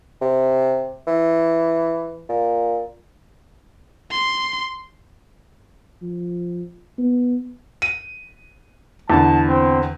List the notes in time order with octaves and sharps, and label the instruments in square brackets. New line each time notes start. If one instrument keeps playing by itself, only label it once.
[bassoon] C3
E3
A#2
[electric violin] C6
[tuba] F3
B3
[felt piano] D#7
[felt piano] E2 D3 [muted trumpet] A5
[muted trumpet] C4